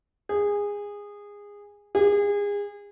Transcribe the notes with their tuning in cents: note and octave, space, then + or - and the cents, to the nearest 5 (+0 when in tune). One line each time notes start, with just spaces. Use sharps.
G#4 -20
G#4 -30